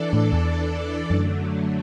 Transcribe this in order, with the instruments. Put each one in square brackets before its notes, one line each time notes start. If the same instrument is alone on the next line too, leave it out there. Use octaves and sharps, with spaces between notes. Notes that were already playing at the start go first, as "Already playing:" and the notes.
Already playing: [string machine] E3 D4 A4 D5
[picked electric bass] A2
E2
[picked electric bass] F#2 [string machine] D3 F#3 A3